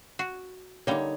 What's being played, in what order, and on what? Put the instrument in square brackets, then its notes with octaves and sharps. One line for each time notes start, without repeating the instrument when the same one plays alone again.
[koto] F#4
[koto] D3 G3 A#3 [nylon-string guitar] D#4 C#5